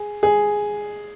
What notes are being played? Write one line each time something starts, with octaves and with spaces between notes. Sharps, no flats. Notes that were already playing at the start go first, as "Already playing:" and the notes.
Already playing: G#4
G#4